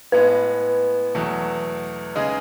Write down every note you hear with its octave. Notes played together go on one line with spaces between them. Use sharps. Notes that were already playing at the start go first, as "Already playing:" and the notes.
A2 G#3 B3 B4
E2 B2 F#3 A3
C#3 G#3 D#4 G#4